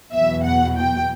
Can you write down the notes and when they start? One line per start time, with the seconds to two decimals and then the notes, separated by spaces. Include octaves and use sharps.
0.12 E2 B2 F#3 E5
0.44 F#5
0.77 G5